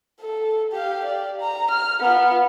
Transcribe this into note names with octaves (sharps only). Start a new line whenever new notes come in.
A4
G4 F5
D5
A#5
F6
B3 F4